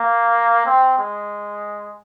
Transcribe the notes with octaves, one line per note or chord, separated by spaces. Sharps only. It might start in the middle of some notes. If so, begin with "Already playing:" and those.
Already playing: A#3
C4
G#3